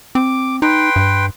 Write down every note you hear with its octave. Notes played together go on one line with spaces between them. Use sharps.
C4 D6
D#4 B4 G5 C6
G2